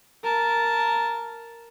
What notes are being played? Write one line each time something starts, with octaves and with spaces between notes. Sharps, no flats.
A#4 A5